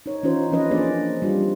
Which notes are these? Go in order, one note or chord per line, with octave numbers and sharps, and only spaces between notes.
D#4 C#5
E3 C#4 D#4 F4 C5
E3 F3 C4 C#4 B4 D#5
A#3 D4 G#4 C5 D5
G3 C4 D4 F4